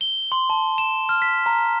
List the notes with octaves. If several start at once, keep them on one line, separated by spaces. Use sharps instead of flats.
G7
C6
A5
E7
F6
B6
A#5